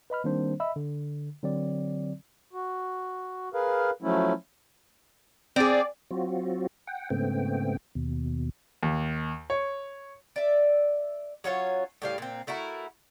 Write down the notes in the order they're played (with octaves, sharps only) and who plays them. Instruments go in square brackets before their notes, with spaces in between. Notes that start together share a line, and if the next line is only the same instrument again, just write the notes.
[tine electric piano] B4 D#5 B5 F6
D#3 G3 A#3 C4 D4 C5
D#5 E5 B5 E6
D3
D3 F#3 C4 D5
[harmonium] F#4
G#4 A#4 B4 F5
F3 F#3 A3 C#4 E4
[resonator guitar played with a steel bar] C4 G#4 [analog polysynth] D5
[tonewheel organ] F#3 C4 F4 F#4
F#5 G5
G#2 C#3 A3 B3 C4 G5
D#2 B2
[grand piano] D#2
C#5
[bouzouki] D5 E5
F#3 C#4 F4 C#5
A2 G3 F5
A#2 C4
A3 E4 F#4 A#4